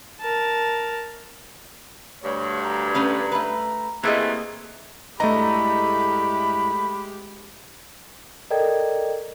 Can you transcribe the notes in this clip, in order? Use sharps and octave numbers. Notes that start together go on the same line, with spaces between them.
A#4 A5
D2 G2 C#5
A#5
A3 C#4 B4
A3 B4
C3 E3 A3 A#3 G#4 D#5
G2 G#3 A3 E4 G4 D#5 A#5 B5
A4 A#4 D5 D#5 G5 G#6